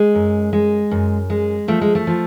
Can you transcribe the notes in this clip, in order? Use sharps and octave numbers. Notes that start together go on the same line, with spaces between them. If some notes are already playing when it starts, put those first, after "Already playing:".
Already playing: G#3
F#2
G#3
F#2
G#3
F3 A3
G#3
A3
F3